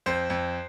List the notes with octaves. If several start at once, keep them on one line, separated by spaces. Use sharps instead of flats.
F2 C5
F2